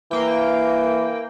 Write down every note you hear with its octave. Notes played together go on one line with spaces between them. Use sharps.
E3 A#3 G5